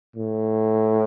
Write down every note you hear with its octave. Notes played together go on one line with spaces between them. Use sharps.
A2